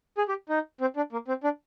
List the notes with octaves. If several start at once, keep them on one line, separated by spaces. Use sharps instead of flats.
G#4
G4
D#4
C4
D4
A#3
C4
D4